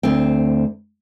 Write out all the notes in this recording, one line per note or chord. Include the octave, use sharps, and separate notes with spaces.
D2 C4